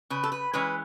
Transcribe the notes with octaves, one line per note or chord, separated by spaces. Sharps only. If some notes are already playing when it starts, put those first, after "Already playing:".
C#3 B4
A4
B4
E3 G#3 C#4 B4